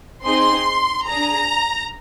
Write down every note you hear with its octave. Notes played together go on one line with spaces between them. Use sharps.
C4 D#4 G#4 C6
D4 G#4 A#5